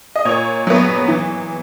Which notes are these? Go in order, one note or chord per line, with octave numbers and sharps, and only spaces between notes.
D#5
A#2 C#5
F#3 B3
E3